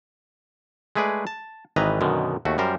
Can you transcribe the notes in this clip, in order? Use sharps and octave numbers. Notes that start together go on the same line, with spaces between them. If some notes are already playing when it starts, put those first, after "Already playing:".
G#3 A3 G#4 B4 D5
A5
G#1 D#3 E3 B4 D#5 A#5
F#2 B2 D3 D#3
D#2 A3 F#4
F#2 G3 A#4 C5